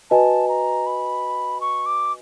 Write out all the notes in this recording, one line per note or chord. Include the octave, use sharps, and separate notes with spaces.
F#4 B4 D#5 G#5 A5
A#5
B5
C#6
D6